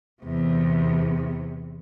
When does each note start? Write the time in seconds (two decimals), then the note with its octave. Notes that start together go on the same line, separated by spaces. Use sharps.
0.23 E2 C3